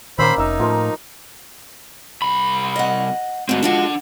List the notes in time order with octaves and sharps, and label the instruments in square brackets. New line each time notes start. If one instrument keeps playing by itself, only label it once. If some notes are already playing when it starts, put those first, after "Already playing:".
[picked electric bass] A#2 D#3 [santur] A#3 C#4 E6 [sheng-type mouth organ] C5 B5
[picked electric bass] F1 [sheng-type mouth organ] D#4 [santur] E5 E6
[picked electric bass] A2 [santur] F3 A#4 C5
[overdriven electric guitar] C2 B5
[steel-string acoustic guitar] D#5 F#5
[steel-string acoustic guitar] G#2 A3 [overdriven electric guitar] C4 F#4
[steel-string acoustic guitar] F3 G#3 F#4 [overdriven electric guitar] D4 F#5